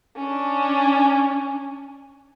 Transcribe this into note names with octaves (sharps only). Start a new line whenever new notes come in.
C#4 D4